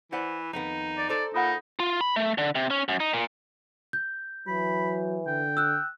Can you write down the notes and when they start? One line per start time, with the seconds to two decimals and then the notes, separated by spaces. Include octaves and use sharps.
0.12 E3 C5 D5 F#5
0.53 F2 D#3 B3 D#4
0.98 D5
1.09 A4 C5 D5 A#5
1.34 A#2 D#4 F#5 B5 D#6
1.80 F4
2.01 B5
2.16 A3
2.38 D3
2.55 C3
2.71 C#4
2.89 F#2
3.00 D#4
3.14 A#2
3.93 G6
4.47 E3 F#3 B5
5.27 D3 G5
5.57 E6 F#6